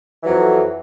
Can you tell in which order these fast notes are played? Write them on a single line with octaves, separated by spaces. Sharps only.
E3 F#3 F2